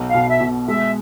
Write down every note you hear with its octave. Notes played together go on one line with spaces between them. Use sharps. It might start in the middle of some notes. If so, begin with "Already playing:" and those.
Already playing: B1
F5
B2
E5
B2
G#3 E5